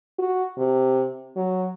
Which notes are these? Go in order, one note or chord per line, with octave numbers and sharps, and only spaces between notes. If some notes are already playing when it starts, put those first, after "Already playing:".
F#4
C3
F#3